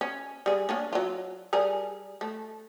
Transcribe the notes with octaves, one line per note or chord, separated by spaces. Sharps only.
C#4
G3 G#4
A#3 C#4 D4
F#3 F4
G3 G#4 A#4
A3